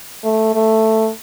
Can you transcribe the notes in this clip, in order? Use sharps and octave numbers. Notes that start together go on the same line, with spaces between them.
A3
A3